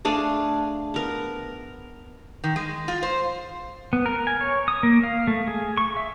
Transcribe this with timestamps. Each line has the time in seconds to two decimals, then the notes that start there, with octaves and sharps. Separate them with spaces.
0.05 A3 D4 G#4 F5
0.94 B3 A#4
2.44 D#3
2.56 G#3
2.88 F4
3.03 C5
3.93 B3
4.06 A#4
4.27 G#5
4.41 C#5
4.68 D#6
4.83 A#3
5.03 F5
5.27 A3
5.48 G#4
5.77 C#6
5.97 E5